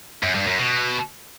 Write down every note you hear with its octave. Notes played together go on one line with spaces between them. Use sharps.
F#2
G2
F#2
B2